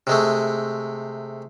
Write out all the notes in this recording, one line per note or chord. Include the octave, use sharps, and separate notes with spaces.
C3 G#3 A3